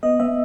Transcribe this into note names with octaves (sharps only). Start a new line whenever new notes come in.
B3 D#5
B3 E5